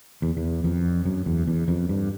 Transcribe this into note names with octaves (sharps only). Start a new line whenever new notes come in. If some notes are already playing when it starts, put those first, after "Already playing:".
E2
E2
F2
F#2
E2
E2
F2
G2